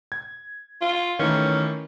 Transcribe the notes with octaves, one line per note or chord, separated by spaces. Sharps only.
G#6
F4
D#3 E3 A3 C#4